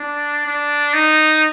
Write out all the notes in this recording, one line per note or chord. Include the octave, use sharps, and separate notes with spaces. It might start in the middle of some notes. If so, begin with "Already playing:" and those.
Already playing: D4
D4
D#4